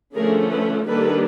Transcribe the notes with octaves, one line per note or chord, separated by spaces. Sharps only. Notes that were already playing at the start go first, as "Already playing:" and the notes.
D3 F3 A3 C#4 G#4 A#4
A4 B4
D#3 G3 A#3 D4 A4 B4